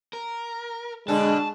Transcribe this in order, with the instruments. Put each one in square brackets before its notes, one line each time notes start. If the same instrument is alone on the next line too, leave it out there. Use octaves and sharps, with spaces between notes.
[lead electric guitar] A#4
[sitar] B2 D3 D4 [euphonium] G#3 [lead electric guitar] A5